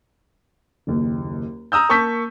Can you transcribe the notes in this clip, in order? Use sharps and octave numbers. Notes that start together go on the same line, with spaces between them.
F#1 D#2
A#5 D#6 E6 G6
A#3 A5 C#6 E6 G6 B6